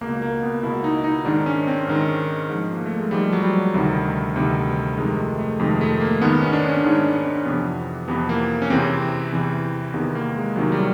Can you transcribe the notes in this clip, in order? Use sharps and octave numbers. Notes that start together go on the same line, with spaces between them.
C#2 B2 A#3
A#3
B3
C#2 B2 E4
D#4
D#4
G#2 D#3 D4
C#4
C4
G#2 D#3
G#2 F3
A#3
A3
G#3
G#2 F3 G3
F#3
G3
D2 C3 D#3
D2 C3 D#3
F2 C3 D#3 G#3
A3
A3
F2 C3 D#3 G#3
A3
A#3
G#2 D#3 B3
C#4
D4
C#4
G#2 D#3
D4
C#4
F2 C3 E3 B3
F2 C3 E3 B3
A#3
C#4
E2 C3 E3 C4
E2 C3 E3
E2 C3 D#3 B3
A#3
G#3
E2 C3 D#3 F#3
G3